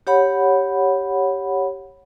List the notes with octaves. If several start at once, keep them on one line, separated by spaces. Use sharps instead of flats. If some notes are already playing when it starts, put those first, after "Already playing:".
G4 C#5 F#5 B5